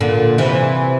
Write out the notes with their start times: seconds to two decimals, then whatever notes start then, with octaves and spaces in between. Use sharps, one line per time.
0.01 A#2 D3
0.38 C3 E3